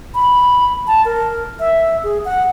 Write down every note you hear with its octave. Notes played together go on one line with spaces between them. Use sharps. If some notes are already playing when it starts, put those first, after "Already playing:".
B5
A5
A#4
E5
G#4
F#5